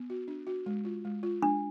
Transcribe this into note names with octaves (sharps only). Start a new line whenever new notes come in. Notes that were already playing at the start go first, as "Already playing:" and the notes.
Already playing: B3
F#4
D4
F#4
G#3
F4
G#3
F4
G#3 D4